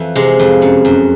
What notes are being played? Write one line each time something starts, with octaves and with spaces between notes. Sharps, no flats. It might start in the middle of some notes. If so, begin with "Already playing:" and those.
Already playing: F2 E3
C3 G#3
F2
F#2
F#2